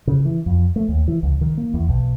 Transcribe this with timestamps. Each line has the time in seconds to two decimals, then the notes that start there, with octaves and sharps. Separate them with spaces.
0.07 C#3
0.25 E3
0.46 F2
0.76 A3
0.89 D#2
1.08 E3
1.23 C#2
1.41 D#3
1.57 A#3
1.74 E2
1.89 B1